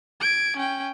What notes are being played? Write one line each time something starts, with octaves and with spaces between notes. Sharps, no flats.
G#6 D7
C#4 G5